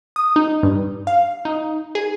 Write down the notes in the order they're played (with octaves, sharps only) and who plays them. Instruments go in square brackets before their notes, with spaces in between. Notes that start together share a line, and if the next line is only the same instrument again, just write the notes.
[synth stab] D#6
D#4
G2
F5
D#4
G#4